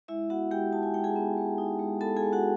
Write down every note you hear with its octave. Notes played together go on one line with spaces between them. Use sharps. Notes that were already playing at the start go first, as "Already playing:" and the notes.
G#3 E4 E5
B3 F#4 F#5
G#3 G4 G5
D#4 A5
G#5
G#3 G5
G#4 G#5
B3
G#3
D#4
G#3
B3 A4 A5
G#4 G#5
G#3
F#4 F#5